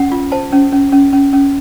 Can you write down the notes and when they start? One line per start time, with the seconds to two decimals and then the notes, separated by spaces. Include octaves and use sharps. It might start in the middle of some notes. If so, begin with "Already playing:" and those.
Already playing: C#4 F#5
0.12 F4
0.32 C5 A5
0.53 C#4
0.72 C#4
0.92 C#4
1.13 C#4
1.33 C#4